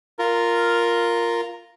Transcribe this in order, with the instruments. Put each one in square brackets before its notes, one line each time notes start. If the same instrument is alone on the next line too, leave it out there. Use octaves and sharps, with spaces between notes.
[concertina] F4 A#4